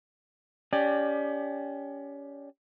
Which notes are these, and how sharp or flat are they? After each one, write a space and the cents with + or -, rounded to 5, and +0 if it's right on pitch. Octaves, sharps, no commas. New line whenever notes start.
C#4 +30 G4 +10 D5 +25